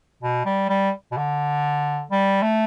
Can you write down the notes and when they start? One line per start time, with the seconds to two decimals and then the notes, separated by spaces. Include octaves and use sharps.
0.23 B2
0.46 G3
0.69 G3
1.12 B2
1.17 D3
2.11 G3
2.43 A3